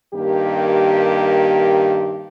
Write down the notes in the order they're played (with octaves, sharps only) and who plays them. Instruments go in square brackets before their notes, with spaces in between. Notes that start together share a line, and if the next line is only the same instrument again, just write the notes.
[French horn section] G2 D#3 A#3 G4